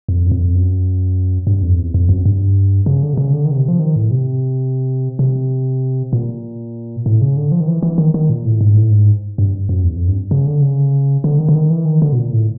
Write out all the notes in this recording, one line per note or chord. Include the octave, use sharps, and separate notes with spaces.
F2
F#2
F2
F#2
G2
F2
E2
F2
F#2
G2
C#3
D3
C3
C#3
D3
D#3
C#3
C3
F3
D#3
A2
C3
C3
A#2
A2
C#3
D3
F3
D#3
E3
E3
D#3
D#3
A#2
A2
G#2
A2
G#2
G2
F#2
E2
F2
G2
C#3
D3
C#3
D3
D#3
D3
D#3
E3
D#3
D3
B2
A#2
A2